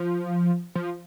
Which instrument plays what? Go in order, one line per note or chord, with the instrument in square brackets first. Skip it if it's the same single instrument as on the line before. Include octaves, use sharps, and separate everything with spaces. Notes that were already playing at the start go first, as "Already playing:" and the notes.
Already playing: [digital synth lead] F3
F3